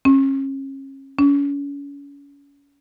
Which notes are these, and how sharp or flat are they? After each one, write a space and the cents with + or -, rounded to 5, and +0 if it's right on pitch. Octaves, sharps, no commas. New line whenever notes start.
C#4 -35
C#4 +35